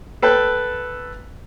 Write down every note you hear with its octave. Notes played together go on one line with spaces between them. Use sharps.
A4 B4 G5 A5